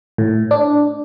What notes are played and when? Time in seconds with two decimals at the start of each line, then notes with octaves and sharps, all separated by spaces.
0.18 A2
0.51 D4